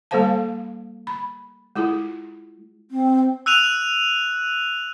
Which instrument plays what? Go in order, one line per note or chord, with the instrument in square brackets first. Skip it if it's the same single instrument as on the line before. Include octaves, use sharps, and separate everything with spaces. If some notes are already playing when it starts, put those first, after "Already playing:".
[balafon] G3 A#3 A4 C5 F5 A5
B5
G#3 E4 F4 G#4
[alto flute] C4
[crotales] E6 F#6 D#7 F7